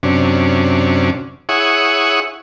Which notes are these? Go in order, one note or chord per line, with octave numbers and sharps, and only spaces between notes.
F#2 C3 C#4 D4
E4 G#4 C#5 F#5 C#6 D#6